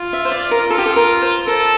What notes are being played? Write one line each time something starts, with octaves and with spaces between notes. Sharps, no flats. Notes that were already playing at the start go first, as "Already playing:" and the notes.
Already playing: F4
E5
C5
D5
A#4
F4 A4
G4
A4
A#4
C5
A4 A#4